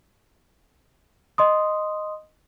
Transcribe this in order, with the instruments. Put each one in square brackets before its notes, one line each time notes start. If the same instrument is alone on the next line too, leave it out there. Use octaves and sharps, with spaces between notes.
[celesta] D#5 C6 D#6